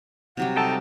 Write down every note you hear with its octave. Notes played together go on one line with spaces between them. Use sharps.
C3 F#3 G3 F#5
D#4 A4 G5 A5